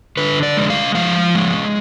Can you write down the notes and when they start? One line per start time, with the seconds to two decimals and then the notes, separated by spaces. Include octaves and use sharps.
0.17 D3 B4
0.43 D5
0.57 G#3
0.70 F5
0.95 F3 F5
1.35 G#3